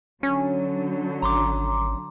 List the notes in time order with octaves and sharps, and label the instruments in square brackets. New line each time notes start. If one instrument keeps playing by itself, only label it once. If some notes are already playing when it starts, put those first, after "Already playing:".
[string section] D3 F#3 [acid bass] C#4
[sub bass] G#1 [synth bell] A#5 C6 D6